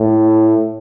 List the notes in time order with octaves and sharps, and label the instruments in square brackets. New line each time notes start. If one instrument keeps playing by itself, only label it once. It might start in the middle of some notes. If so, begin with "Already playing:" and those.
Already playing: [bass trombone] A2